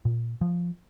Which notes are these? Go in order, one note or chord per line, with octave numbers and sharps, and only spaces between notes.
A#2
F3